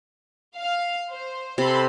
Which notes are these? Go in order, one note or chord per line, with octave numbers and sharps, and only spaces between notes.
F5
C5
C3 A4 B5 C6